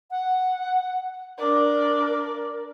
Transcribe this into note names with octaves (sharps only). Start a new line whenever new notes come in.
F#5
D4 A#4 D5